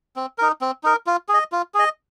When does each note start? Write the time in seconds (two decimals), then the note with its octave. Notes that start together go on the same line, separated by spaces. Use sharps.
0.16 C4
0.38 D#4 A#4
0.61 C4
0.83 D#4 A#4
1.06 F4
1.29 G#4
1.34 D#5
1.52 F4
1.74 G#4 D#5